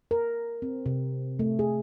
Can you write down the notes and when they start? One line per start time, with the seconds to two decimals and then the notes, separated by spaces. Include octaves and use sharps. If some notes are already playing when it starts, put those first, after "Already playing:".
0.11 A#4
0.62 C4
0.86 C3
1.39 A3
1.59 G#4